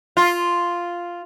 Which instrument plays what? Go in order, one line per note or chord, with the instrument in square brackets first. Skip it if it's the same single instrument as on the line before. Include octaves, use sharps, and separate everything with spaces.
[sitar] F4